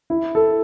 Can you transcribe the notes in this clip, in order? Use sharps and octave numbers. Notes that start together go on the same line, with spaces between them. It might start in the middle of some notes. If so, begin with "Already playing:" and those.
E4
A4